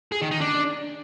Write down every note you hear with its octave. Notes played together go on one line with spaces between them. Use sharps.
G#4
D#3
D#4
D4